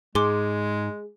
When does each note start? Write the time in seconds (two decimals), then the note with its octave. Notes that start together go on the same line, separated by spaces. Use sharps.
0.15 G#2 G#3 G#4 C6 D6